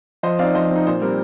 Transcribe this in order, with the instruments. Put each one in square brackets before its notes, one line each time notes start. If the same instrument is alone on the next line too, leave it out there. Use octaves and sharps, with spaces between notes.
[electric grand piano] F3 [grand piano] C5 D#5
[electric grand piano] C4 D#4 [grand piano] D5 F5
[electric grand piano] F3 [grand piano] C5 D#5
[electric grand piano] C4 D#4
[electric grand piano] A#2 [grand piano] C5
[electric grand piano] G3 C4 [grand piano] A#4